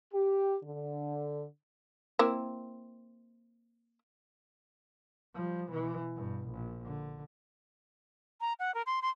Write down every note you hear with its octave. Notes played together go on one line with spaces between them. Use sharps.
G4
D3
A#3 C4 E4
F3 G3
B2 E3
G2 B2
A#1
D3
A#5
F#5
A#4
C6
C6